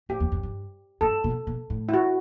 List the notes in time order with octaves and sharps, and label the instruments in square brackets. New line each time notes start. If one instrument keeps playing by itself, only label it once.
[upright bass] A2 [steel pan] G4
[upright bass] E2
F#2
G2
[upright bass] G2 [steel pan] A4
[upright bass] B2
B2
A2
[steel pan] E4
F#4